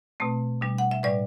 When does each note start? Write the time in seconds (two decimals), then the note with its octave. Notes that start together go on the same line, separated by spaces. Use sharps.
0.20 B2 A3 C4
0.61 B2 G3 D4
0.78 F#5
0.91 E5
1.03 A2 G3 D4 B4 D5